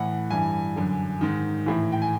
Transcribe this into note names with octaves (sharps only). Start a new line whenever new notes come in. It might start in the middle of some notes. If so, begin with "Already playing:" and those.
Already playing: A2 E3 F#5
G2 E3 G#5
F#2 D3
G#2 D#3
A2 E3
G5
G#5